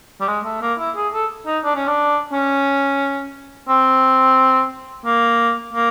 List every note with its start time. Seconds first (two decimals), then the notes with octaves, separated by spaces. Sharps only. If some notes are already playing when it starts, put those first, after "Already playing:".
0.21 G3
0.28 G#3
0.45 A3
0.62 A#3
0.79 E4
0.97 G#4
1.14 A4
1.47 D#4
1.65 D4
1.76 C#4
1.88 D4
2.33 C#4
3.69 C4
5.05 A#3
5.73 A#3